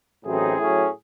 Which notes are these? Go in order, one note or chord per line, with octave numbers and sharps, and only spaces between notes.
A1 A2 F#3 C4 D#4 G#4
A2 F#3 C#4